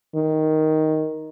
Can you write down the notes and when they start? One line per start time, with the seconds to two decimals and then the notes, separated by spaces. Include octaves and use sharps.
0.15 D#3